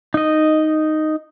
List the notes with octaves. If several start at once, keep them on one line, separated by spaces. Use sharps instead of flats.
D#4 D#5